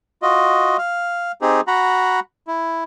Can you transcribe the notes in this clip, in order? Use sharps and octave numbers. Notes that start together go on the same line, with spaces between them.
F4 F#4 D#5
F5
C4 D#4 G4 G#4
F#4 F#5 A#5 B5
E4